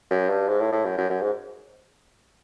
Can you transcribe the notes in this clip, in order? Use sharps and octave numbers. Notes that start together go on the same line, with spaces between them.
F#2
G2
G#2
A2
A2
F#2
F#2
F#2
G#2